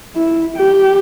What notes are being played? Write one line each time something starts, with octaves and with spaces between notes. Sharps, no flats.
E4
G4